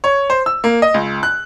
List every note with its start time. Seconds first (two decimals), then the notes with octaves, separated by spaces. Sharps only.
0.04 C#5
0.30 C5
0.46 E6
0.64 A#3
0.82 D#5
0.94 C#2
1.23 F#6